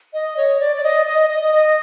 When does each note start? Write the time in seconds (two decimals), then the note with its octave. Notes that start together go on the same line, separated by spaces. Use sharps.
0.13 D#5
0.37 C#5
0.60 D5
0.76 D5
0.84 D#5
1.06 D#5
1.30 D#5
1.53 D#5